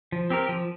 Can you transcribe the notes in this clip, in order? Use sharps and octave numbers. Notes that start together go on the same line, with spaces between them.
F3
C4 G4 A#4
F3